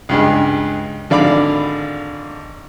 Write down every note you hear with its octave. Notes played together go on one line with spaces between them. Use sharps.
C#2 G2 G#3
G#1 D3 D5 F5 B5 D6